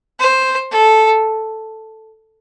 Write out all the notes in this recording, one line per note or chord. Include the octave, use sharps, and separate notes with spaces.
C5
A4